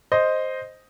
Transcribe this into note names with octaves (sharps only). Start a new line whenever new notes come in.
C5 D#5